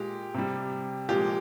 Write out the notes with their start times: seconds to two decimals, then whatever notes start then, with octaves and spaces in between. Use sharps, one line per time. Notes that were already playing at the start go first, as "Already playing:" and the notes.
Already playing: A#2 G#3 G4
0.34 C3 G3
1.09 A#2 F3 G#3 G4